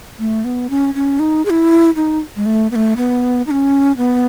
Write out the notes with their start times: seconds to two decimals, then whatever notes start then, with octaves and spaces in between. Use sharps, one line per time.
0.19 A3
0.44 B3
0.70 C#4
0.95 C#4
1.19 D#4
1.45 G#4
1.50 E4
1.96 D#4
2.36 G#3
2.46 A3
2.71 B3
2.76 A3
2.97 B3
3.47 D#4
3.51 C#4
3.97 B3